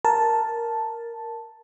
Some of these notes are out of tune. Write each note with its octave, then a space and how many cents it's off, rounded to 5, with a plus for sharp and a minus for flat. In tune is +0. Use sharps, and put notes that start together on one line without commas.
A#4 +0 A5 +0